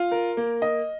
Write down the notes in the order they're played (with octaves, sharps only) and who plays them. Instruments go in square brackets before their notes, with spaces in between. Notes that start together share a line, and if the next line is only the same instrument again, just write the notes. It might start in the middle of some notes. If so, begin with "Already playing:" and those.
Already playing: [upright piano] F4
A#4
A#3
D#5